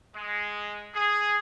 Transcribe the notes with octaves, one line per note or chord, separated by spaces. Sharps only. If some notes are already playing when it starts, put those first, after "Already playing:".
G#3
G#4